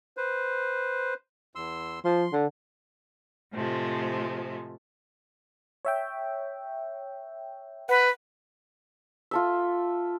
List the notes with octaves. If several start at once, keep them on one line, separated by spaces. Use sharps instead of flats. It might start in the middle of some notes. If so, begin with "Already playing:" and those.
B4 C5
E2 C6 E6
F3 C6
D3
A2 C3 F3 G#3 A3
C#5 E5 G5
B4 F#5
F4 A4 E5